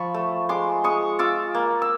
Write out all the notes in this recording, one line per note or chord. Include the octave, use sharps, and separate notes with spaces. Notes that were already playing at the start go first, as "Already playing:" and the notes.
Already playing: F3 B5 C#6
A3
G#3 C6 D6
G#3 C#6 D#6
F4 D6 E6
A#3
E6